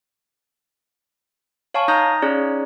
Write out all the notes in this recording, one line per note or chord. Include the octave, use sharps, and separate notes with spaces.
C#5 F5 G#5 A5 C#6
D#4 A#5 D#6 G6 A#6
C#4 D#4 G#4 C#5 D5